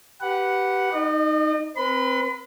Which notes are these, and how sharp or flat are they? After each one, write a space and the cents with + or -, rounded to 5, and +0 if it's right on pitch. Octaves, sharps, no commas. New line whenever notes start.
G4 -20 B4 +0 F#5 +0
D#4 +0 D#5 -40
C4 +5 B4 -25 B5 +45